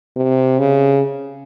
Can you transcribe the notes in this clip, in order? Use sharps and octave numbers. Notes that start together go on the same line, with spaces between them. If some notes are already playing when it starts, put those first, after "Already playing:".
C3
C#3